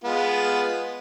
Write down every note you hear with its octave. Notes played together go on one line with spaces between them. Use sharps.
G#3 B3 F4